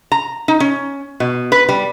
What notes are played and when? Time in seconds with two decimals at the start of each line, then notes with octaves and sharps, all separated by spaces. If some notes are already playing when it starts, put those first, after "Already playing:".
0.12 A#5
0.48 D#4
0.60 C#4
1.20 B2
1.52 B4
1.69 G3